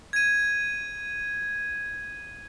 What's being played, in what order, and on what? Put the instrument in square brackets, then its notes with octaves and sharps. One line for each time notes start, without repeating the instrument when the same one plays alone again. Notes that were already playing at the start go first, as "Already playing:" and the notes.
[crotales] G#6 D#7